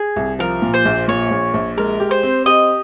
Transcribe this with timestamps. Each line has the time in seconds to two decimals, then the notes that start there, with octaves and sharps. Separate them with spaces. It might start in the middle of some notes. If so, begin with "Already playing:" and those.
Already playing: G#4
0.16 C2
0.39 F3 A#4
0.62 A#2
0.74 C5
0.85 A#1
1.08 A#2 C#5
1.31 A#1
1.54 A#1
1.77 G#3 A#4
2.00 G4
2.11 C5
2.23 C4
2.46 G4 D#5